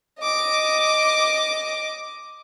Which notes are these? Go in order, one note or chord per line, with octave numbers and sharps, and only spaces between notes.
D#5 D6